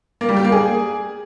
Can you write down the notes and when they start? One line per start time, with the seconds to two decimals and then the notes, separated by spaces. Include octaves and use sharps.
0.21 A#3
0.29 G3
0.37 G4
0.44 A#3
0.52 G#4